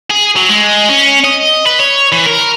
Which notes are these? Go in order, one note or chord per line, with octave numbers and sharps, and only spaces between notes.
G#4
F#3
G#3
C#4
D#5
B4
C#5
E3
A#4